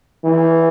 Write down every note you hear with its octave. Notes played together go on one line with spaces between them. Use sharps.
E3